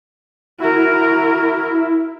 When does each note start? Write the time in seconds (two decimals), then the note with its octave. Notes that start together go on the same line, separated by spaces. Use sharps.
0.60 E4 F#4 A#4